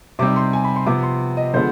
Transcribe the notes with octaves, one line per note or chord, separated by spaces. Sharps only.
C3 G3 C4 D#4 D6
C6
G#5
B5
C6
C3 F3 B3 D6
C6
D#5
D3 F3 G#3 B3 C5